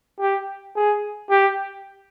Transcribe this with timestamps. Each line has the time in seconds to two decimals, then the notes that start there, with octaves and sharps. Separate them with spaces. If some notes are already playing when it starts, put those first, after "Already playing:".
0.20 G4
0.76 G#4
1.30 G4